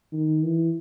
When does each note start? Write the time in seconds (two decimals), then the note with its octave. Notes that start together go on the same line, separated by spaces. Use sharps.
0.13 D#3
0.43 E3